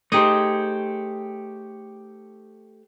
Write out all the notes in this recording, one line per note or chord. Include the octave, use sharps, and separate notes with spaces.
A3 D#4 G4 G#4 C5 D#5